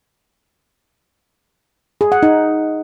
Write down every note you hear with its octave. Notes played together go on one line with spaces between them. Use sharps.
G#4
F#5
D#4